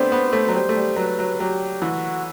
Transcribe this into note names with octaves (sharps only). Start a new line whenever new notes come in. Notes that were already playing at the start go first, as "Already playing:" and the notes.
Already playing: A3 B3 C4 D4 C5
B3
A3
F#3
G3 C5
A3
G3
F#3 B4
F#3
F#3 G4
E3 F#4